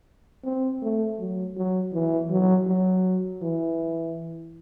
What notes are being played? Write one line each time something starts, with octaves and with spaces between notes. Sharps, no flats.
C4
A3
F#3
F#3
E3
F#3
F#3
E3